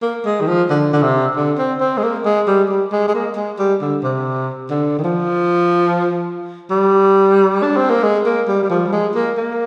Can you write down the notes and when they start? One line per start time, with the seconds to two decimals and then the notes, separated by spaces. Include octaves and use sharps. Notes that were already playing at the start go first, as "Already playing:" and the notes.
0.02 A#3
0.25 G#3
0.41 D#3
0.47 F3
0.70 D3
0.93 D3
1.03 C3
1.36 D3
1.59 C4
1.80 C4
1.98 G#3
2.04 A#3
2.25 G#3
2.47 G3
2.70 G3
2.92 G#3
3.08 G#3
3.15 A#3
3.36 G#3
3.59 G3
3.81 D3
4.03 C3
4.71 D3
4.99 D#3
5.04 F3
6.71 G3
7.63 D4
7.77 C4
7.90 A#3
8.03 G#3
8.26 A#3
8.48 G3
8.63 G3
8.70 F3
8.87 G3
8.93 G#3
9.15 A#3
9.38 A#3